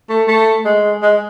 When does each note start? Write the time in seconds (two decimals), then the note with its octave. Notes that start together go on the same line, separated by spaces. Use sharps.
0.09 A3
0.28 A3
0.65 G#3
1.02 G#3